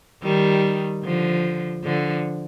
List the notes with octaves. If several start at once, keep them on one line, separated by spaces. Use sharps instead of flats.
D#3 G3
D3 F3
D3 F3